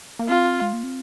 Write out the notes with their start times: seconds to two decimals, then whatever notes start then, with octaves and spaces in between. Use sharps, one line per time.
0.19 A#3
0.28 C4 F4
0.61 G#3
0.73 A#3
0.83 C4